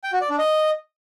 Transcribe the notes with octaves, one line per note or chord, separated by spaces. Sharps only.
G5
F#4
D5
D4
D#5